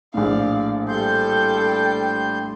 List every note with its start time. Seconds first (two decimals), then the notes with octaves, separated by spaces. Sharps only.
0.14 A#1 A2 D5 F5
0.88 G3 A4 G5 C6 G6